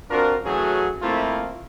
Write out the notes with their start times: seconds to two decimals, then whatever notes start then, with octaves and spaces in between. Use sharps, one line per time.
0.10 C4 D4 F4 F#4 A#4
0.44 E3 F#3 A3 C#4 F#4 G#4
1.02 F2 A3 A#3 C4 E4 F4